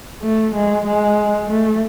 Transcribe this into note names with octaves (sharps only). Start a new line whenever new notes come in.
A3
G#3
G#3
A3